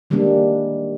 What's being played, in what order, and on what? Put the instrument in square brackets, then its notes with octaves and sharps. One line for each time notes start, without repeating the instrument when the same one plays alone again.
[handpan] D#3 G3 G#3 A#3 D4